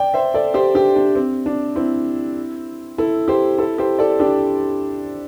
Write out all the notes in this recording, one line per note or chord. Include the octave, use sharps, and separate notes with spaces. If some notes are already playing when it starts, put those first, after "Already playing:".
Already playing: D5 G5
C5 E5
A4 D5
G4 C5
D4 G4
D4
C4
D4
C4 E4
E4 A4
G4 C5
E4 A4
G4 C5
A4 D5
D4 G4